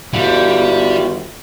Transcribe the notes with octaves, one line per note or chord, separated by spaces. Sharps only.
G1 G3 E4 F#4